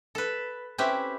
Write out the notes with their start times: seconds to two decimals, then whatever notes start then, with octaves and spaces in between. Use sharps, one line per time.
0.15 A4 B4
0.78 C4 C#4 E4 G4 B4